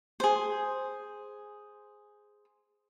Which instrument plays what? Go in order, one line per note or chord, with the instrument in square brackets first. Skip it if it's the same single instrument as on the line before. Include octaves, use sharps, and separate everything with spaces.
[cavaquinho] G#4 C5